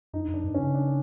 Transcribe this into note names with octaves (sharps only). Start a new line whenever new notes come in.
F#2 D#4
F#2
D4
G2
C#3 C#4
D4